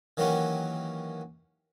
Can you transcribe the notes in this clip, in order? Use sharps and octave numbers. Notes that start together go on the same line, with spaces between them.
D#3 E3 F#3 A#3 C#4 G4